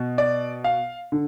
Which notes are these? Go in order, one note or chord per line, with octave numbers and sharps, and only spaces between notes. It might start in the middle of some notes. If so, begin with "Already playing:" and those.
Already playing: B2
D5
F5
D3